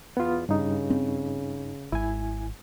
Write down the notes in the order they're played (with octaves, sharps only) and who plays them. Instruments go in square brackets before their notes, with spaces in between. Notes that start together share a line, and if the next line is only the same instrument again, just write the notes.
[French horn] E2 [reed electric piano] B3 F4
[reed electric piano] G2 D#4 [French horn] C#3
[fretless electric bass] C4
[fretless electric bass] G#1 [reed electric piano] E4 G#5